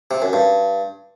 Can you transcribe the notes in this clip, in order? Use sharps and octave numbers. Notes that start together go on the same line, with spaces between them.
C3
F#2
G2